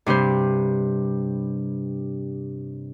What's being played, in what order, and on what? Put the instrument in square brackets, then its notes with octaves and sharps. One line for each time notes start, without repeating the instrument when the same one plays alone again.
[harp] G2 C3 G3 C5